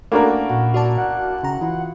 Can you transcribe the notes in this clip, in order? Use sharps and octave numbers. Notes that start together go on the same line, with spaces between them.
A3 A#3 C#4 D4 E4 F#4 A4 A#4
A#2 F#4
F#4 D5 E5 A5
F#5
C#3 A#5
E3 E4 F4